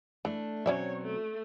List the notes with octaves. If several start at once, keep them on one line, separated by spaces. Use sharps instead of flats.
E3 A3 D4
B2 F#3 C4 C#4 C#5 D5 E5
A3